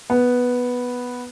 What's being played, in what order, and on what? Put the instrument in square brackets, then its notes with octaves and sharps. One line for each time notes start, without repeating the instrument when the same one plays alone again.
[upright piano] B3